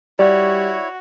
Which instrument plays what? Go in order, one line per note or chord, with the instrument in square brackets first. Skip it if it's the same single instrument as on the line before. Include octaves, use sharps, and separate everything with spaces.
[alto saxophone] G3 [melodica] E4 C#5 [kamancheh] F#4 [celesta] D5